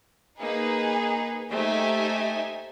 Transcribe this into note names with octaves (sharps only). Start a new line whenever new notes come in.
A#3 D#4 G#4 B4
A3 D#4 G4 C5 E5 G#5